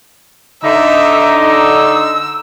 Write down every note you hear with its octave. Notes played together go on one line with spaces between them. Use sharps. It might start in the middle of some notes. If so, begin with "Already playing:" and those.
D3 D#4 E5
E6